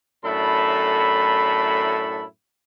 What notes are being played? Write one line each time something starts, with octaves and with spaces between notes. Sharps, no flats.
F#2 A2 D4 E4 A4 B5